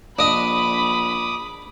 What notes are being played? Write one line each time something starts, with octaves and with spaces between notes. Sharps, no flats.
A#1 D4 D#5 B5 D6 D#6